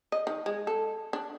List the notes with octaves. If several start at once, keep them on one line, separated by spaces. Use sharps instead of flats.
D#5
D#3
G#3
A4
D4